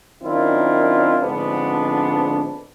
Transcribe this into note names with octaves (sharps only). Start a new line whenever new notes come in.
F#2 D#3 C4 D4 E4 F4
G#2 D3 F3 B3 C4 D4